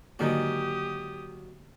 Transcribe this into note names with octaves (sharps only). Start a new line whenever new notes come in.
G#2 D3 D#3 F#3 A#3 G4 D5 D#6